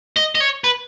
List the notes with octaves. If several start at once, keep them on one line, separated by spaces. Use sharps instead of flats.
D#5
D#5
C#5
B4